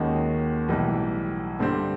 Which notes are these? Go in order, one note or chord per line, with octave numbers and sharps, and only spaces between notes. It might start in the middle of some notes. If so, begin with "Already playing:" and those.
Already playing: D#2 D#3 G#3 C#4 F#4
B1 A2 E3 G3
G2 D3 G3 C4